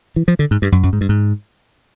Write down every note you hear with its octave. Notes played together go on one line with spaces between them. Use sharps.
E3
F3
D3
G#2
G2
F#2
F#2
G#2
G2
G#2